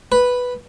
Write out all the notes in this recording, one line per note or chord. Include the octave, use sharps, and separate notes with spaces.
B4